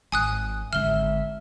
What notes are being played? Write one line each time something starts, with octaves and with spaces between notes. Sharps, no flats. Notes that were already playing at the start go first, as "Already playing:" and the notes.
G#1 G#5 D#6 F#6
G#1 D3 E5 F6 G7